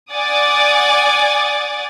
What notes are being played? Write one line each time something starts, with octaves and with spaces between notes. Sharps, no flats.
D5 F#5 G#5 D6 D#6 A6